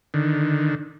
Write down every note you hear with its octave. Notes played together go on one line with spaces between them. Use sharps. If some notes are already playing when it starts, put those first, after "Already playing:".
D3 D#3